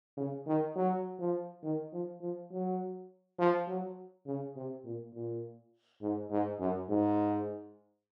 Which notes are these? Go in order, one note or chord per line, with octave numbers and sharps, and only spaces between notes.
C#3
D#3
F#3
F3
D#3
F3
F3
F#3
F3
F#3
C#3
C3
A#2
A#2
G#2
G#2
F#2
G#2